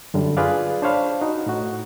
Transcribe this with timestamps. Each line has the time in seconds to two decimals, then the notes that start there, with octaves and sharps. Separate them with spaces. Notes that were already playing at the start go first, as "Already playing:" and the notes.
0.14 F#2 D3 G3
0.37 F4 G#4 B4 D5 F5
0.82 D4 C5 C#5 F5 B5
1.21 D#4 F#4
1.46 A2 F#4